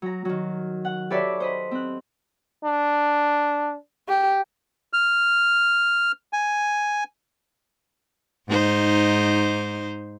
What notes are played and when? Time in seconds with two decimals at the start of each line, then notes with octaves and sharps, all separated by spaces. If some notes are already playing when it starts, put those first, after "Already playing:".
0.02 F#3 A#5
0.25 D#3 F#3
0.85 F#5
1.10 G4 A4 B4 C#5 D5 E5
1.40 C5 D#5 B5
1.71 C4 F#6
2.65 D4
4.08 G4
4.93 F6
6.33 G#5
8.48 G#2 D#4 C5